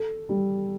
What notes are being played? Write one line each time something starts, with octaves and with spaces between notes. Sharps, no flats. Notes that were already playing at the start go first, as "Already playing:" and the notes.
Already playing: A4
G3